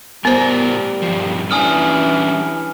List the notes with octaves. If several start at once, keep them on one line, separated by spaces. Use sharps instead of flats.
A2 G3 B3 A#4 C5
G2 F3
E3 G3 C#4 D4 G#5 D#6 F6